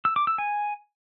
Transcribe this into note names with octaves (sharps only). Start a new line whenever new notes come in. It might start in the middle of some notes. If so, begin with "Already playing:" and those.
E6
D6
E6
G#5